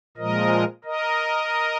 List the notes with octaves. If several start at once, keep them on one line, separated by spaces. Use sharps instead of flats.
A#2 F3 G#3 A#4 D#5
A#4 D#5